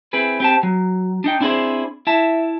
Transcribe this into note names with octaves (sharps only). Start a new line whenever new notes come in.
C4 E4 G#4 B4
C4 G4 A5
F#3
D4 D#4 G5
C4 D4 E4 F4 G#4 C5
E4 E5 A5